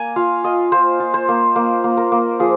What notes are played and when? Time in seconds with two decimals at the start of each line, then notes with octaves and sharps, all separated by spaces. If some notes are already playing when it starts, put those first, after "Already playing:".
Already playing: A#3 G#5 A#5
0.16 F4 F5
0.44 F4 D#5
0.72 F4 C5
1.00 F4
1.14 C5
1.29 A#3
1.56 A#3
1.84 A#3
1.97 A#4
2.12 A#3
2.40 F3 G#4